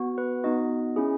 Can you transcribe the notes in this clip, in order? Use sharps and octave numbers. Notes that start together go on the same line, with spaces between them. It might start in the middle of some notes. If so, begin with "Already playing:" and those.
Already playing: B3 F#4
B4
B3 D#4 F#4 D#5
C#4 E4 G#4